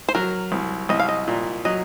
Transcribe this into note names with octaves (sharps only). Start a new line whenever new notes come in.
C5
F#3 A#4
C2
C2 D#5
F5
D#5
A#2
F#3 D#5